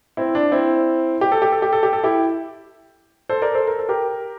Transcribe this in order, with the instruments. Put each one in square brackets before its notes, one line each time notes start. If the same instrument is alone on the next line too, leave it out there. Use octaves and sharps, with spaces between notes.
[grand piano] C4 E4
D4
C4 E4
G4
A4
G4
A4
G4
A4
G4
A4
E4 G4
A4 C5
A#4 D5
A4 C5
A#4
A4
G4 A#4